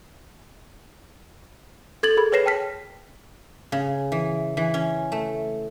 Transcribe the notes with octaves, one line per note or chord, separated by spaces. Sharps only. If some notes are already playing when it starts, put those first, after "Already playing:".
A4 G#6 A6 F#7
G#4 A#4 B5 G#6
G#4 B4 C#5 A#6 C7 E7
G5 A5 F6 B6
C#3
E3
E3
C#4
A3